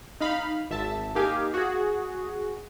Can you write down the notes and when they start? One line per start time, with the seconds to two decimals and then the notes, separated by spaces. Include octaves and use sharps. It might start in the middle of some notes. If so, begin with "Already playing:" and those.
0.21 D#4 F5 B5
0.70 G#1 E5 A5
1.15 A#3 D#4 G4 F5 G#5
1.54 F#4 G#4